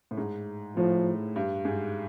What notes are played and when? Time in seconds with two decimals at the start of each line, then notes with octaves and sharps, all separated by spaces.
0.11 A2
0.18 G#2
0.77 A2 F3
1.36 G2
1.65 G#2